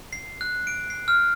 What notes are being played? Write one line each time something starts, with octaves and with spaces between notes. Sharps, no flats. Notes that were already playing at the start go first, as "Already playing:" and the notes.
C7
F#6
D7
C7
F6